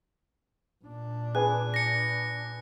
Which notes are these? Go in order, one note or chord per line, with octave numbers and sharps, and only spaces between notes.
A#2 D4
G#4 B4 G#5 F#6
A#6 C#7